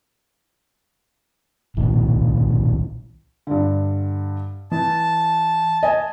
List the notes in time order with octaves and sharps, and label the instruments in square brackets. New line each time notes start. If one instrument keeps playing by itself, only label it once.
[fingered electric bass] B1 A#2 D#3
[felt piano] G2 D3
[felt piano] E3 [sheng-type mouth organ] A5
[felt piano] D#5 G#5 A5